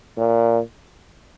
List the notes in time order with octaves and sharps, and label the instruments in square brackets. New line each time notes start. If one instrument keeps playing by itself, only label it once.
[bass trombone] A#2